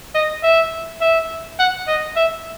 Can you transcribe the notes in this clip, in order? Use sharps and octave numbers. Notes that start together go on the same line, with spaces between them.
D#5
E5
E5
F#5
D#5
E5